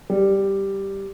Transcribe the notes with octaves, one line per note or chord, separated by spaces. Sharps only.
G3